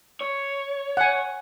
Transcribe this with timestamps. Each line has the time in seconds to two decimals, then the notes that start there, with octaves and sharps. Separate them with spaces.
0.21 C#5
0.97 F#5 G#5